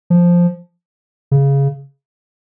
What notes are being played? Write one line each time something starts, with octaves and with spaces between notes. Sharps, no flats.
F3
C#3